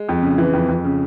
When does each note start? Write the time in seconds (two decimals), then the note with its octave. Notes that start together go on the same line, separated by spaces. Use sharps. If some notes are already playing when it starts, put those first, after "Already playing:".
Already playing: G#3
0.09 F2
0.23 C#3
0.38 E3
0.53 F2
0.68 F2
0.85 C#3